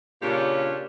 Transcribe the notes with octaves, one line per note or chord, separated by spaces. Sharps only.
A#2 C#3 C#4 D4 F4 G4